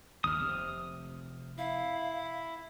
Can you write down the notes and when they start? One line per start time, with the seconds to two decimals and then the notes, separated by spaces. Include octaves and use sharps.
0.24 G1 D#2 D#6 F6
0.39 F1 C3
1.58 E4 F5